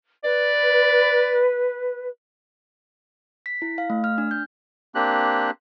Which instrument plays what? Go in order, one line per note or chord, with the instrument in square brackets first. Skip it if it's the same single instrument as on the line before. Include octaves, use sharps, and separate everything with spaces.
[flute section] B4 [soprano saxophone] D5
[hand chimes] B6
E4
F5
A3
F6
D4
G6
[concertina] A#3 C4 D4 G4 F#6